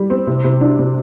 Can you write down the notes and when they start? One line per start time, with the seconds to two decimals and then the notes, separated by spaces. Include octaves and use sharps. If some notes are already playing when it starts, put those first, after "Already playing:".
Already playing: G3
0.10 C4
0.27 C3
0.44 C3
0.61 D4
0.79 C3